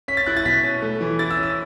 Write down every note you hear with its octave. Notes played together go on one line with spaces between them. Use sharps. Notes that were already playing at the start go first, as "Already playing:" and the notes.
C#4 B6
A6
E4 F#6
A6
B2 B6
C#4
A3
E3
E4 A6
E6
C#4
E6